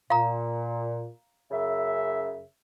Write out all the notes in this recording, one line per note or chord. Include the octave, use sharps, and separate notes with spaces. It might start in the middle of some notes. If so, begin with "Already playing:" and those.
A#2 F5 A#5
F#2 C#3 E5